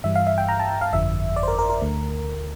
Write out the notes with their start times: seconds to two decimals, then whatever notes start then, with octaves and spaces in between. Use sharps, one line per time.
0.04 G2 E3 G3 E5
0.16 F5
0.27 E5
0.38 G5
0.49 A#5
0.60 A5
0.81 F5
0.92 G1 F2 D3 F3 E5
1.36 D5
1.43 C5
1.48 A#4
1.59 A#4
1.70 A#4
1.81 D2 D3 A3